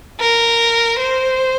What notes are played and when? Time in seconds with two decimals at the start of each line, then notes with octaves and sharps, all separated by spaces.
0.20 A#4
0.99 C5